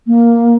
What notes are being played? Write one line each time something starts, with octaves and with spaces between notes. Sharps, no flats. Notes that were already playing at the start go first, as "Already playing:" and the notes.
A#3